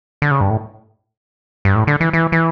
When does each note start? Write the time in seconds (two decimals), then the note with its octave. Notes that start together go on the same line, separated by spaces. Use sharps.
0.22 D3
0.31 C#3
0.41 G2
0.50 A2
1.65 G2
1.75 A2
1.87 D3
2.01 E3
2.13 E3
2.32 E3